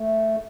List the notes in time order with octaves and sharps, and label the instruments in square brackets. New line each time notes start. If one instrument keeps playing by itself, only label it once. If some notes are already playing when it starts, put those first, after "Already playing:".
Already playing: [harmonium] A3